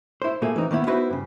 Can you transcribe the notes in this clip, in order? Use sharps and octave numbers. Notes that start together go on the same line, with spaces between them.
E4 C5
A#2 A3 A#3 G#4
E3 C4 D#4
D#3 A#3 B3 E4
B3 D#4 E4 F#4 B4 C5
G2 C#3